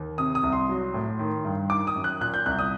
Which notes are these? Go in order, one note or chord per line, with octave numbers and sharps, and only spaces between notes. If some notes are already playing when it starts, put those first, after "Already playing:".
Already playing: D#2
C3 D#6
D#6
C2
C6
F#3
A2
D#3
G2
D#3 D6
D#6
F#2
F#6
A#2 F#6
G6
C2 F#6
D#6